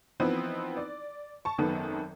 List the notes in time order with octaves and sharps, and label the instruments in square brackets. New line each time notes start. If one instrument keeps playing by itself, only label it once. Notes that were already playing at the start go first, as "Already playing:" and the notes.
[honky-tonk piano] E3 F3 B3 C4 D#4 E4
D5
A5 C#6
G#1 F#2 D#3 B3 A4 A5